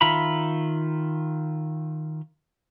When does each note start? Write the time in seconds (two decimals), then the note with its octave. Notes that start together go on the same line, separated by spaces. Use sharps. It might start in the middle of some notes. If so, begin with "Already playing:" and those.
0.01 D#3 F4 E5 A#5 B5